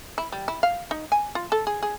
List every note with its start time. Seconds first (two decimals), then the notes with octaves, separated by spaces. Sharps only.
0.18 E4
0.32 G3
0.48 E4
0.63 F5
0.91 D#4
1.12 G#5
1.35 F4
1.52 A4
1.67 G#4
1.83 G#4